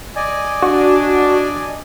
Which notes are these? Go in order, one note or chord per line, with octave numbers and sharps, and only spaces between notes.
D5 D#5 G#5
D4 F#4